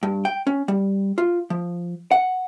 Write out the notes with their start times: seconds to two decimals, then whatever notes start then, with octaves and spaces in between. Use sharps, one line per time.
0.03 G2
0.25 G5
0.47 C#4
0.68 G3
1.18 F4
1.50 F3
2.11 F#5